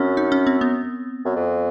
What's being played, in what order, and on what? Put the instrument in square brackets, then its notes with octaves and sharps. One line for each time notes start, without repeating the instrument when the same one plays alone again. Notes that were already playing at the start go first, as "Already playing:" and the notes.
Already playing: [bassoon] F#2 [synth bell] C4 C#4
[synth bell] D#4
C#4
C4
B3
[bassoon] F#2
F2